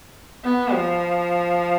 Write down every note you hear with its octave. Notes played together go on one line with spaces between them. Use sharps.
B3
F3